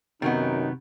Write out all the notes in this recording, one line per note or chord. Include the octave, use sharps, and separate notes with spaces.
F#2 C3 D#3 F#3 B3 D#4